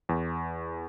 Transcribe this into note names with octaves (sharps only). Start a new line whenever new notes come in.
E2